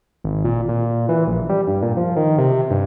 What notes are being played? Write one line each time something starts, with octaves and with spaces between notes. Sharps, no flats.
G#1
A#2
A#2
E3
A#1
G3
G2
A#2
F3
D#3
C3
G2